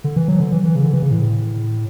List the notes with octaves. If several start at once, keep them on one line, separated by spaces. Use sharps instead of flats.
D3
E3
F#3
D3
E3
E3
C#3
D3
E3
C#3
A2